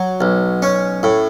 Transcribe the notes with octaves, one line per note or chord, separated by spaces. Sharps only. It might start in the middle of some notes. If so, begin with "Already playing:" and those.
Already playing: F#3
B1
C#4
A2